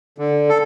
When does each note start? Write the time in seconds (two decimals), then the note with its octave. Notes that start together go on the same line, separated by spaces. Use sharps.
0.18 D3
0.49 A4